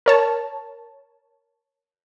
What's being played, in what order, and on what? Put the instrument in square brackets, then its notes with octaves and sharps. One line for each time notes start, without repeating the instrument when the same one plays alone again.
[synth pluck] A#4 C#5 A5